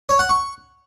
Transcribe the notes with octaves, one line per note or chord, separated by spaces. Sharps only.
C#5
F#5
C#6